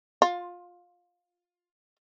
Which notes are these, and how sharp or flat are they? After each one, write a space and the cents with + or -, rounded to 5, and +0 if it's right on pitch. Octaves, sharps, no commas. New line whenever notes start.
F4 +20